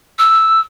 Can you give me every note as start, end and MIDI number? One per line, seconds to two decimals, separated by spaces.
0.19 0.60 88